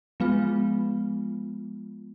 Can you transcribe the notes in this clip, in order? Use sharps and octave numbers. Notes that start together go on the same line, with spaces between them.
F3 G#3 B3 F4